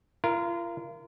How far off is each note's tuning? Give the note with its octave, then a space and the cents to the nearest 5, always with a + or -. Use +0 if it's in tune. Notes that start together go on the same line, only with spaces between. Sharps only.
F4 -40 A#4 +5